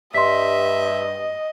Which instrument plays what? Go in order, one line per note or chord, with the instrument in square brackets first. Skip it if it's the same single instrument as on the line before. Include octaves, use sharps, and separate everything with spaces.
[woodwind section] G2 [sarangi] D#5 [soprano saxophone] E5 [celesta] C6 B6